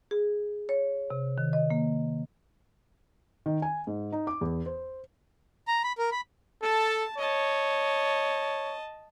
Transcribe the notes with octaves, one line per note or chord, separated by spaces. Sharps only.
G#4
C#5
C3
D#3
D#5
A#3
D#3
G#5
G#2
D#4
D6
E2
C5
A#5
B5
A#4
B5
A4 A5
C#5 D#5 A5